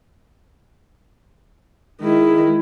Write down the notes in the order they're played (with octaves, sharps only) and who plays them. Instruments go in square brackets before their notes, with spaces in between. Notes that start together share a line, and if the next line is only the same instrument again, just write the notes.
[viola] D#3 E4 [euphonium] G#3